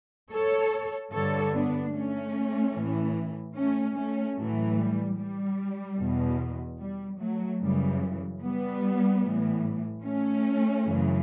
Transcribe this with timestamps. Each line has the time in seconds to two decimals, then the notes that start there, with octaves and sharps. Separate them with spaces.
0.31 A4 C#5
1.12 G2 D3 A4 C#5
1.53 B3 D4
1.93 A3 C#4
2.74 A2 E3
3.55 A3 C#4
3.95 A3 C#4
4.36 A2 E3 F#3 A3
4.77 G3
5.17 G3
5.98 E2 B2
6.79 G3
7.19 F#3 A3
7.60 F#2 C#3 E3 G3
8.41 G3 B3
9.22 A2 E3
10.03 A3 C#4
10.84 F#2 C#3 E3